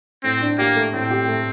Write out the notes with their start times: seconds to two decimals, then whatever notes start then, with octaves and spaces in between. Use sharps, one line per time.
0.24 A2 C4
0.42 D4
0.58 A#3 G4
0.76 A3
0.94 A2 C4
1.11 G4
1.28 A3